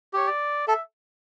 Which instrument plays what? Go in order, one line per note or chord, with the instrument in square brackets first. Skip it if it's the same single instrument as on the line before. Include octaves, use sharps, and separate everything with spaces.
[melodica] G4 [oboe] C#5
[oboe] D5
[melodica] A4 [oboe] E5